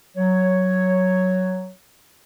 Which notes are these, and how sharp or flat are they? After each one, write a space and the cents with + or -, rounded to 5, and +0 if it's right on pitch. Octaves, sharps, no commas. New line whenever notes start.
F#3 +5 C#5 +0